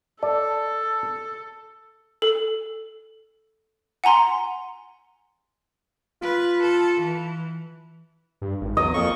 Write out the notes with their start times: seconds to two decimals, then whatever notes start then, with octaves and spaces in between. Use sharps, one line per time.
0.23 A4 D5 A5
2.22 A4
4.04 F#5 G#5 A#5 C6
6.22 F4 B4
6.62 A4
7.00 E3
8.42 G2
8.61 G#1
8.77 E2 F#3 D#5
8.94 F2 A#3 C#6